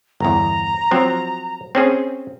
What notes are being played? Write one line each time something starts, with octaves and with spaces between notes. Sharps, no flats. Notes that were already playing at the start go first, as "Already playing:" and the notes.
G1 E2 A#5
F3 F#3 C4
C4 C#4 G#4